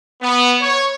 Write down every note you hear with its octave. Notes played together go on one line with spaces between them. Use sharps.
B3
C#5